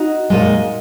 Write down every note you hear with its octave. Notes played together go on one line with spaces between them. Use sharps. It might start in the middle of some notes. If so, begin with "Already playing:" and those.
Already playing: D#4 F#4
A#2 G#3